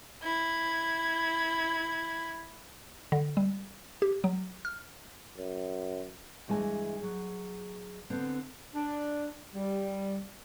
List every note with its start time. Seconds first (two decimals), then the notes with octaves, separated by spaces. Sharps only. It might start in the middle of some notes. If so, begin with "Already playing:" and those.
0.23 E4 G#6
3.12 D3
3.37 G3
4.02 G4
4.24 F#3
4.65 F6
5.38 F#2
6.48 G2 E3 G#3 A#4 G#5
7.00 F#3 G#4
8.10 D3 B3 C4
8.74 D4
9.55 G3